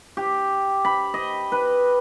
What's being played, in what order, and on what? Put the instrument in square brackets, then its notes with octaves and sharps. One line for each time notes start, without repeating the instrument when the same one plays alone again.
[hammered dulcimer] G4
B5
D#5
B4